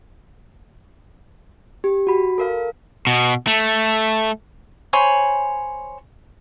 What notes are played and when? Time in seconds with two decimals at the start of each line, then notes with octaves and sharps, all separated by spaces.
1.84 G4
2.07 F#4 B5
2.38 A4 A#4 F5
3.07 B2
3.47 A3
4.93 C5 C#5 G#5 B5